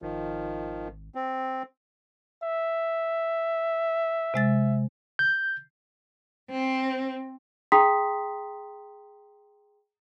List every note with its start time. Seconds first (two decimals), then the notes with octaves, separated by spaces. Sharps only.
0.02 G#1 D#3 F3
1.15 C4
2.43 E5
4.34 C3 G#3 A6
5.19 G6
6.51 C4
7.72 G#4 G5 A#5 C6 D#6 B6